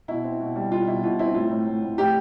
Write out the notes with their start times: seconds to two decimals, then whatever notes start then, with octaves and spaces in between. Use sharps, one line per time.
0.08 B2 E4
0.24 C4
0.40 B2
0.56 G3
0.71 G3 F4
0.87 B2 E4
1.03 B2 F4
1.19 C4 E4
1.34 A2 F4
1.51 A2
1.66 A2
1.82 A2
1.98 A2 G4